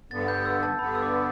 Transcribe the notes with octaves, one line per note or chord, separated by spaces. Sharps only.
G2 D3 B3 A6
G6
E6
A5
G2 D3 B3 B5
E6
D6